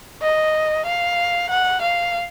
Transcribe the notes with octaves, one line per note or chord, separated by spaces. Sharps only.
D#5
F5
F#5
F5